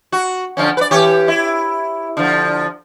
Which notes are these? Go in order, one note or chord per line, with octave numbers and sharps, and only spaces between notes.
F#4
D3 F3 C#4
B4 D5
E3 G4 C#5
E4
D3 F3